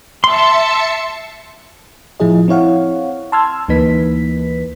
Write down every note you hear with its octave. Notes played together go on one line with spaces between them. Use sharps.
E5 A5 C6 C#7
A2 F3 E4 G#4 D#5
C4 E4 C#5 F5 F#5
A5 C6 E6 F6 G#6
D2 E3 A#3 D#4 B4 B6